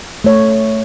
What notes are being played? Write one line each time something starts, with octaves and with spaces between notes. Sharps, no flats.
A3 C#5